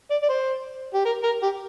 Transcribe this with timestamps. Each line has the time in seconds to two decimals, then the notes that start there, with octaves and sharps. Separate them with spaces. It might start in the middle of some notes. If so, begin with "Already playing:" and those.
0.11 D5
0.23 D5
0.29 C5
0.94 G4
1.05 A#4
1.24 A#4
1.43 G4